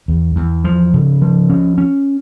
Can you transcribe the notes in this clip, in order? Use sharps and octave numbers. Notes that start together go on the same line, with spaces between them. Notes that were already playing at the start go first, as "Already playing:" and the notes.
E2
E2
F3
C#3
F3
C#4
C#4